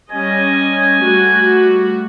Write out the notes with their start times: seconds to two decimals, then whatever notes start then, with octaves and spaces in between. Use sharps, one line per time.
0.12 G3 C#4 D#5 G#5
1.02 G3 A3 F#4